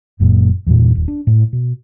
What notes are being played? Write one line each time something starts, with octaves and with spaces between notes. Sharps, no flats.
F#1 F#2 A#2
E2 G2 A#2
D#1
D4
A2
B2